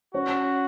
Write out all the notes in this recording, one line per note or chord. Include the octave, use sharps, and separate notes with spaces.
C#4 F#4 C#5